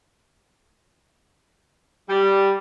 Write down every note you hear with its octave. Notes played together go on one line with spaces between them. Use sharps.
G3